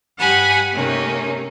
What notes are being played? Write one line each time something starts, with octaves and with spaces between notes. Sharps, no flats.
G2 G4 F#5 G#5 B5
C3 A3 A#3 C#4 D#4